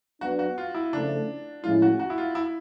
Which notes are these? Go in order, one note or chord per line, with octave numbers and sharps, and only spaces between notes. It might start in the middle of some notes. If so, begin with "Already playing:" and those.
F#3 B3 D4 F#4
F#4
F4
E4
C#3 F3 A3 D4
A2 F3 G#3 C#4 E4 F4
F#4
F#4
E4
F4
E4